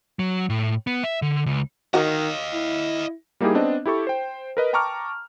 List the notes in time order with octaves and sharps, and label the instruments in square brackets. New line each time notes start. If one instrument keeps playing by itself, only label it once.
[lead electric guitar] F#3
A2
B3
E5
D3
C#2
[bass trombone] D#3 [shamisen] F#4 A#4 [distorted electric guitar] D#5 F5
[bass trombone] E4
[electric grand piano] G3 A#3 D#4 E4 G4 G#4
B3 C4 D4 D#5
E4 G4 A4 C#6
C5 G5
A#4 B4 D#5
G5 A5 A#5 C#6 D6 F6